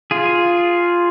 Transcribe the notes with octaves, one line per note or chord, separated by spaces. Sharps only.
F4 G#4